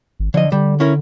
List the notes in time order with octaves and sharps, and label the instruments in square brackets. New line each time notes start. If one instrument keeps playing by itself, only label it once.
[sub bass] G#1
[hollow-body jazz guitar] D3 D#5 [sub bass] F3
[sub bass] D3 [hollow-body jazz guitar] G3
[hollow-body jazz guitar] C#4 E4 A#4